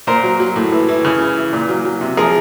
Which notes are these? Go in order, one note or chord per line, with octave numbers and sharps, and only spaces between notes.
A#2 A#4 C5
F#3
F#3
A2
E3
E3
C#3
E3
E3
A#2
F#3
F#3
C3
F3 G#4 A#4